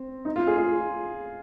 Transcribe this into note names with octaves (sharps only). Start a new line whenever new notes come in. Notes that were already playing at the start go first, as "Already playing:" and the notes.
Already playing: C4
D#4
F4
G#4
F4